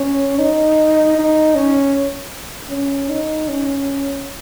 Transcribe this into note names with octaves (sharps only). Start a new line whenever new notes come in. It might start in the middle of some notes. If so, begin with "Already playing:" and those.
Already playing: C#4
D#4
D#4
C#4
C#4
D#4
C#4